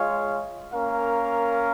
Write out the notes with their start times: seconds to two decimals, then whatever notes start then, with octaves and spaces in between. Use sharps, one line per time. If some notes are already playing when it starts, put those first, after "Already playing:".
Already playing: G#3 F4 C#5 F5
0.73 A#3 C#4 A#4 F5